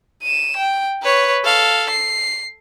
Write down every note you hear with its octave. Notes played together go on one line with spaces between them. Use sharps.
D#7 E7
G5
B4 C#5
A4 F5
C7